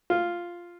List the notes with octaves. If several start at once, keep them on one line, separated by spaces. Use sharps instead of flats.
F4